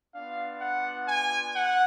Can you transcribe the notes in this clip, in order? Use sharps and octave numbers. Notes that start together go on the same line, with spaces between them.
B3 D4 F4 F5
F#5
G#5
F#5